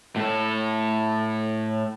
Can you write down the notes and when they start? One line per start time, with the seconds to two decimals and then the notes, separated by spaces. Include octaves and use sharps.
0.16 A2 A4